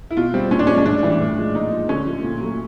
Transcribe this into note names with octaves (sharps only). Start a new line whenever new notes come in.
E4
B2 F4
G3 C4
A#2 C#4
D4
F3 G#3 C#4
C#4
A2 D4
E3 G3
A2
F3 G#3
A#2 D#4
F3 G#3
D3 C#4
F3 A3
A#2
F#3 A3